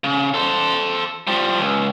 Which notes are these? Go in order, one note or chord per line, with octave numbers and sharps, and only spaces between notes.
C#3
A4 C5
F3 G3
C#2